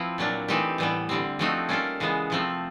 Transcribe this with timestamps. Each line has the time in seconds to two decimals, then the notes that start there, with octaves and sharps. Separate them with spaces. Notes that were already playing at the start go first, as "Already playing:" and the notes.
Already playing: F3 C4 E4
0.18 A#2 F#3 A#3 D4
0.48 E3 A3 C4 D#4 G4
0.78 A2 E3 G3 B3
1.09 D3 G3 C4
1.39 F3 A3 C4 D#4 F#4
1.69 G3 A#3 C#4 F4 A4
2.00 C#3 E3 G#3 B3
2.30 C3 F3 A3 C4